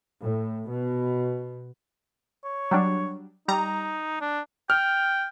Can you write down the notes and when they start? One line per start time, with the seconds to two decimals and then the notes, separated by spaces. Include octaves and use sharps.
0.20 A2
0.70 B2
2.44 C#5
2.71 F#3 G3 D4
3.48 G3 D#4 A#5
4.21 D4
4.70 G5 F6